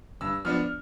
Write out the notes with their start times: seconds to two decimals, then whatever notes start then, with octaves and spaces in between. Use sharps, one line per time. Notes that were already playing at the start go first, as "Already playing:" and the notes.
0.21 G2 E6
0.45 F3 B3 D4 F6